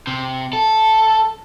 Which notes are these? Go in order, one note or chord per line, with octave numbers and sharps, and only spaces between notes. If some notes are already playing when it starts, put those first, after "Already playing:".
C3
A4